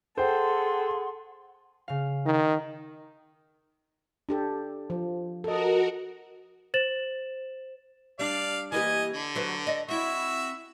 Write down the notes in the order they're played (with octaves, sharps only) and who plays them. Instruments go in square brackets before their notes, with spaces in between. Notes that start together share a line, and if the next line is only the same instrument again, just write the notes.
[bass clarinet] G#4 [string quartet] A4 [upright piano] C5 G5 [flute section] F#5 C6
[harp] C#3 F5
[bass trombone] D#3 [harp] D#4
[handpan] D4 G4 A4
F3
[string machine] F#4 A#4 [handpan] A4 D#5
[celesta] C5 A6 E7 F#7
[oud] G3 D4 [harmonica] D5 F5
[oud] E3 A#3 G4 [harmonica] D#5 G#5
[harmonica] D3
[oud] F#3 B4 C5
D5 D#5
[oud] C4 E4 [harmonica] F#4 E5